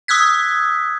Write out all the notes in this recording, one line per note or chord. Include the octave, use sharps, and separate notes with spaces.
D#6 E6 F#6 G#6 B6